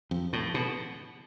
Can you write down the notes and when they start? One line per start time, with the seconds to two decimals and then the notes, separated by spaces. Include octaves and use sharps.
0.11 F2
0.33 A2
0.54 B2